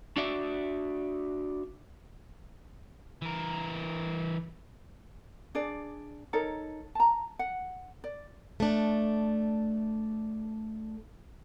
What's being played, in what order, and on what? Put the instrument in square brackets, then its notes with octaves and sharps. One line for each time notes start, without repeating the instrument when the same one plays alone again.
[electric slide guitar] D4 F#4 D5 E5
[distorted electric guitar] E3 A#4
[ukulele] D4 G#4 D5
D#4 A4 A#4 C#5
A5 A#5
F#5
D5
[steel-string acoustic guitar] A3 D4